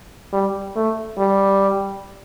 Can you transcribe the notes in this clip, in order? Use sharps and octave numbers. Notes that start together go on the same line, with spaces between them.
G3
A3
G3